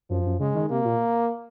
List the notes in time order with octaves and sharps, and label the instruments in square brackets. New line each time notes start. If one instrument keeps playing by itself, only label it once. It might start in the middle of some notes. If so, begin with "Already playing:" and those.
[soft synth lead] F#2 [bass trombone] F3
[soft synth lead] F#2
[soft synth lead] C#3 [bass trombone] G#3
[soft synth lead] D#3
[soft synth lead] C3 [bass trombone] A#3
[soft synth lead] A#2